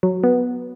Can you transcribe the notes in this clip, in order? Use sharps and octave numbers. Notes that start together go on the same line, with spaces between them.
F#3
B3